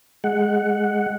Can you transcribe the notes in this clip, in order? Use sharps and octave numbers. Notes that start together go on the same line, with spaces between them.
G#3 F#5